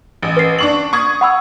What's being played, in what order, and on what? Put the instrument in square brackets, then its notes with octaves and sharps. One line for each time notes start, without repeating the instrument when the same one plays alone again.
[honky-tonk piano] A1
[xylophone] B4 C7
[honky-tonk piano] D4 C#6 F#7
C#6 D#6 G#6
[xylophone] F#5 B5 E6